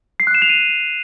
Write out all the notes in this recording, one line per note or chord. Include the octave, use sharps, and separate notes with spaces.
C7
F#6
E7
F7
D#7